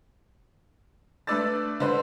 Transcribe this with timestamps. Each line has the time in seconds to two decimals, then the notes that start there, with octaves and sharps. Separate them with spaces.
1.27 A3 D4 B4 D5 E6 A6
1.80 D3 B4 C5